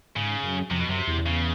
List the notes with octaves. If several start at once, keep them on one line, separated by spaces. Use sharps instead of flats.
G#2 C#3
F#2
F2 C3
B2
F#2 C3
E2
C#3